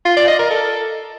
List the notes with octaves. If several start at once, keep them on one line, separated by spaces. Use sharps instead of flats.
F4
D5
D#5
A#4
A4